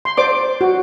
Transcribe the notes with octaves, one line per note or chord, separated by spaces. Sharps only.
C6
C5 D5 D6
F#4